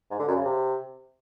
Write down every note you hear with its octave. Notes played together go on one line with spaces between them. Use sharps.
G#2
D3
F#2
C#3
C3